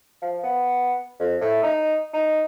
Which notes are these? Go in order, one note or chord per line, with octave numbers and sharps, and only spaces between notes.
F3
B3
F2
A2
D#4
D#4